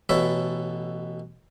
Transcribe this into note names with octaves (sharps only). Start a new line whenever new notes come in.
A1 B2 A4 C#5 E5 B5